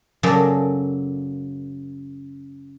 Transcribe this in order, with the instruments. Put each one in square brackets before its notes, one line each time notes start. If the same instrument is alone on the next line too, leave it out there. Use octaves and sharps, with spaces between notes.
[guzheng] F#2 C#3 F#3 A#3 A4 D5